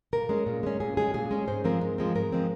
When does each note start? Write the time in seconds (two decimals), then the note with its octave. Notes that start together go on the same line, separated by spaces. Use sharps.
0.13 A#2 A#4
0.29 G#3 C#4
0.46 A#2
0.63 G#3 C#4
0.80 A#2 G#4
0.97 G#3 C#4 G#4
1.14 A#2 G#4
1.31 G#3 C#4
1.48 G#2 C5
1.64 F3 G#3 C4 A#4
1.81 G#2
1.98 F3 G#3 C4
2.15 G#2 A#4
2.32 F3 G#3 C4